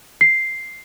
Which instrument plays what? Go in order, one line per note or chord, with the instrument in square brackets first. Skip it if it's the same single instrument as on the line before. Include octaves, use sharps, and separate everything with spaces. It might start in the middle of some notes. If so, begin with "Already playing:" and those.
[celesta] C7